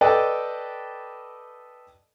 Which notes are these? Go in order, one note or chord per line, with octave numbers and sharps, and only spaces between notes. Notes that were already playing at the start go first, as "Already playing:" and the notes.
A4 B4 D5 D#5 G5